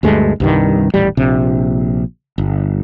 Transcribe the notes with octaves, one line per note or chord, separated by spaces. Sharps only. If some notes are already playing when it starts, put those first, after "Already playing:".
D2 G2 G#3 A3
C2 G2 D#3
D#1 A1 G3
A#1 C3
G1